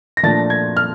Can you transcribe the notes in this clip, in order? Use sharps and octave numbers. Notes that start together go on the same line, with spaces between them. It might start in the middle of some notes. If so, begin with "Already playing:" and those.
A#6
A#2 F3 A3 D4 A6
G#6
F6